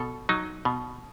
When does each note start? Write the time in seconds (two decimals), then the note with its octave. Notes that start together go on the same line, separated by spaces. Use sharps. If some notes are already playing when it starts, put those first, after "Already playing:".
Already playing: B2 A4
0.29 F#3 D#4
0.65 B2